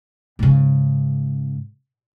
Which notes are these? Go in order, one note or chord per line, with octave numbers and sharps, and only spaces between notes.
G#2 C#3